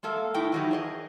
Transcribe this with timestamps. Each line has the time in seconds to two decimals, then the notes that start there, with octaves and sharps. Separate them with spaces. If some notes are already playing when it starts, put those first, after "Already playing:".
0.03 G#3 A#3 A4 E5 F5
0.34 A2 A3 D#4 E4 G5
0.52 D#3 E3 F#3 G3 D#4 E4
0.71 G#4 A#4 D5 D#5